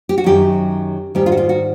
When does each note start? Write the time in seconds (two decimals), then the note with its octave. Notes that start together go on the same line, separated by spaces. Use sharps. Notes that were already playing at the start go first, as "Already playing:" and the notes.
0.09 G4
0.18 F#4
0.24 F#2 D#3 F#3 G4
1.15 G#2 D#3 G3 G4
1.26 F4
1.32 F#4
1.37 F4
1.49 F#4